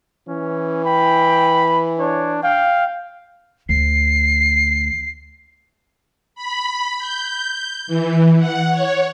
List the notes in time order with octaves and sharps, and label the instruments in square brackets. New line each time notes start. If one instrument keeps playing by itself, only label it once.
[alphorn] E3 [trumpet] C#4
[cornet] G5 [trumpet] B5
[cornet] D4 [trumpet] C#5
[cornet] F5 [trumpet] G5
[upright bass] D2 [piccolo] C7
[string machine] B5
G6
E3
F#5
C#5